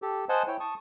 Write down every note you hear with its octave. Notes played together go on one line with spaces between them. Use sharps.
G4 A4
C5 D#5 F#5 G#5 A5
E4 C#5 G5
A5 C#6 D#6